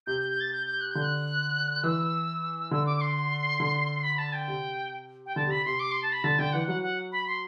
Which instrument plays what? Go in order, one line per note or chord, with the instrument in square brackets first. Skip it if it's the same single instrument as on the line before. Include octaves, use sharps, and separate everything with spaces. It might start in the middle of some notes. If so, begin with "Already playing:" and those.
[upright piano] C3 [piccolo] G6
[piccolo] G6
G6
A6
G6
G6
F#6
[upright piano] D3 [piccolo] G6
[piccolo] F#6
[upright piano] E3 [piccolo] E6
[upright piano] D3 [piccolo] E6
[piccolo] D6
D6
C6
[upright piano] D3
[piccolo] B5
A5
G5
[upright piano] C3
[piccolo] G5
[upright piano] D3 [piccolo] A5
[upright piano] C3 [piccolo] B5
[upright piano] C3 [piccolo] C6
[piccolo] D6
C6
A5
B5
[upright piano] D3 [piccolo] A5
[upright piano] D3 [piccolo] G5
[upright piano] E3 [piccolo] F#5
[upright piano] F#3 [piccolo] F#5
[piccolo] F#5
B5
C6